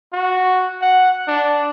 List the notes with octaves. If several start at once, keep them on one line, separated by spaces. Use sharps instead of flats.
F#4
F#5
D4